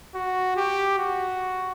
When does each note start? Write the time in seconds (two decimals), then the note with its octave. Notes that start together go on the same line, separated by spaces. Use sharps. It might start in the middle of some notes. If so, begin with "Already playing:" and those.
0.15 F#4
0.57 G4
0.98 F#4